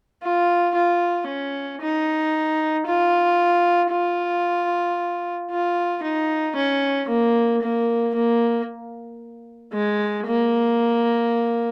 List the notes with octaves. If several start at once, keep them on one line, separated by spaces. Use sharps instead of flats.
F4
F4
C#4
D#4
F4
F4
F4
D#4
C#4
A#3
A#3
A#3
G#3
A#3